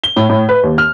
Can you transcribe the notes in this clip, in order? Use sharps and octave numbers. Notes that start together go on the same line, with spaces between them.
G7
A2
A2
B4
D#2
F6